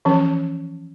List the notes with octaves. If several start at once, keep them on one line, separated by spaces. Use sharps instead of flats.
E3 F3 C#4